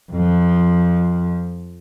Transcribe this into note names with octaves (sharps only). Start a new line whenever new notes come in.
F2 F3